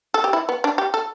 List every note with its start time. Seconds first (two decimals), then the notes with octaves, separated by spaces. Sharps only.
0.14 A4
0.24 G4
0.33 E4
0.49 B3
0.64 D4
0.78 G4
0.94 A4